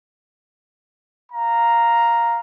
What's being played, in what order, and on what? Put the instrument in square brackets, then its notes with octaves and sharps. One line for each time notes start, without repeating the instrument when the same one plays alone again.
[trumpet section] F5 A#5